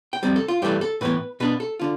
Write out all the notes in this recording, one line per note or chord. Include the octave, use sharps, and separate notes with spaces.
G5
F2 C3 G3 C4
A4
F4
G2 E3 A3 E4 G4
A4
A2 E3 B3 B4
B2 B3 D4 B4
A4
D3 F4